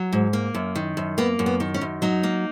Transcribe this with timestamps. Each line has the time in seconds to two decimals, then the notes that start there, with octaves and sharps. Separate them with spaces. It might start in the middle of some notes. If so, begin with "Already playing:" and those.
Already playing: F#3
0.13 G#2
0.33 A#3
0.55 F#2
0.75 D#3
0.97 F#2
1.18 A#3 B3
1.39 F#2
1.46 B3
1.60 D#3
1.74 C#4
1.81 F#2
2.02 F#3 D#4
2.23 A#3